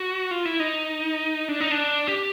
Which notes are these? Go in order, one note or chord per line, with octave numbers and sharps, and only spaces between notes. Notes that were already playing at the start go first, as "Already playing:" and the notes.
Already playing: F#4
F4
E4
D#4
D4
D#4
D4
G4